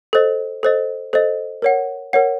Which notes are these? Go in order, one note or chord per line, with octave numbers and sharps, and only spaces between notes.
A4 C5 D#5
A4 C5 D#5
A4 C5 D#5
A#4 C#5 F#5
A#4 C#5 F#5